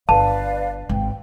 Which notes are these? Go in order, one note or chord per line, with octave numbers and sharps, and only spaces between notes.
G1 B4 D5 F5 A5
G#1 G5